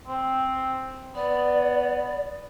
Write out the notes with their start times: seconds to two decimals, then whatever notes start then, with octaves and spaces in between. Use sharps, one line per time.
0.07 C4
1.15 B3 D5